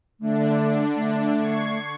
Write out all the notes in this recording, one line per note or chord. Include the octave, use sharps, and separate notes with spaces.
D3 A3 D4
A3
C#6 G#6 C7